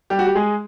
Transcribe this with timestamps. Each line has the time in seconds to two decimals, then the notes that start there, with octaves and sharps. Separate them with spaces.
0.10 G3 G4
0.19 F#4
0.27 G4
0.35 G#3 G#4